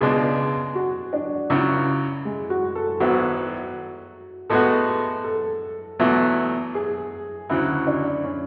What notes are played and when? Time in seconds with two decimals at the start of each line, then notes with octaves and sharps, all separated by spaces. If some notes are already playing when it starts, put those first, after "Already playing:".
0.01 C#2 B2 G#3 D4 G#4
0.75 F#4
1.13 D4
1.50 C#2 C#3 F#3 E4
2.25 G#3
2.50 F#4
2.75 A4
3.00 G#1 G#2 F#3 B3 E4 F#4
4.50 A2 G#3 B3 F#4 A4
5.24 A4
5.99 E2 B2 F#3 A3 E4
6.75 G#4
7.49 D2 C#3 F#3 E4
7.87 D4
8.24 C#4